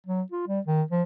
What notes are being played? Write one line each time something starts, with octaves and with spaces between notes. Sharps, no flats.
F#3
F4
G3
D#3
F3